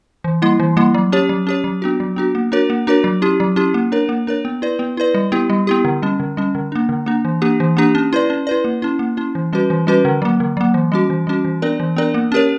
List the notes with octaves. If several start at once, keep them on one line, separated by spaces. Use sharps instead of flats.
E3
G3 A#3 E4
E3
G3 A#3 E4
F#3
C#4 G4 C#5
F#3
C#4 G4 C#5
F#3
B3 D4 F#4
F#3
B3 D4 F#4
A#3
D4 F#4 A#4 C#5
A#3
D4 F#4 A#4 C#5
F#3
C#4 E4 G4
F#3
C#4 E4 G4
A#3
D4 A#4 C#5
A#3
D4 A#4 C#5
B3
E4 B4 D5
B3
E4 B4 D5
G3
B3 E4 G4
G3
B3 E4 G4
D3
G3 C#4
D3
G3 C#4
D3
A#3 D4
D3
A#3 D4
E3
A#3 D4 G4
E3
A#3 D4 G4
C#4
E4 B4 D5
C#4
E4 B4 D5
A#3
C#4 E4
A#3
C#4 E4
E3
G3 C#4 F#4 B4
E3
G3 C#4 F#4 B4
D3
F#3 A#3
D3
F#3 A#3
E3
G3 C#4 F#4
E3
G3 C#4 F#4
E3
B3 D4 A#4 D5
E3
B3 D4 A#4 D5
A#3
C#4 G4 A#4 C#5